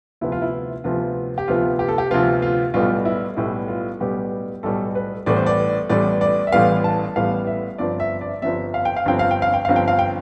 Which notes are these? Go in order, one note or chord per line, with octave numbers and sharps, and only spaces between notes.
D2 C3 F3 B3 E4
F4
E4
D2 C3 F3 B3 F4
G4
D2 C3 F3 B3 F4
G4
A4
G4
D2 C3 F3 B3 F4
F4
B1 A2 G3 B3 F4
E4
B1 A2 G3 B3 E4
F4
B1 A2 G3 B3 G4
B1 A2 G3 B3 A4
B4
A1 A2 E3 G3 B3 D5
C5
D5
A1 A2 E3 G3 B3 D5
D5
E5
A1 A2 E3 G3 B3 F5
A5
A1 A2 E3 G3 B3 F5
E5
G1 G2 F3 C4 D5
E5
D5
G1 G2 F3 C4 E5
F5
G5
F5
G1 G2 F3 C4 G5
F5
G5
F5
G5
G1 G2 F3 C4 F5
G5
F5
G5